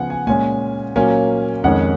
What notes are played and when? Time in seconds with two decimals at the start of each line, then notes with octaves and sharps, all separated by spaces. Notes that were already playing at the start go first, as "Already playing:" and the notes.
Already playing: C#3 F3 B3 F#5 G#5
0.10 G#5
0.27 A#2 G#3 C#4 G#5
0.96 A#2 F#3 A#3 C#4 G#5
1.64 F2 D#3 G#3 C#4 F#5